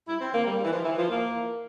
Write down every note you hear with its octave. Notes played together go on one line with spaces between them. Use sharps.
G2 E4
C4
D3 A#3
G3
G2 G3
E3
F3
D3 E3
F3
E2 A#3
E3